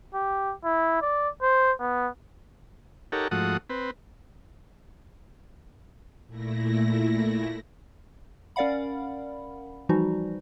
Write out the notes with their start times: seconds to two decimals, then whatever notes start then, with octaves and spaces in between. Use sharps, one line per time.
0.14 G4
0.64 E4
1.01 D5
1.42 C5
1.80 B3
3.12 D#4 G4 A4 A#4 C#5 F#5
3.31 G#2 F3 A3 F#4 F#5 D#6
3.70 C4 B4
6.26 A#2 A3 E4 A#6
8.56 C#4 A#4 D5 F5 F#5 B5
9.89 E3 F3 G3 D#4 F#4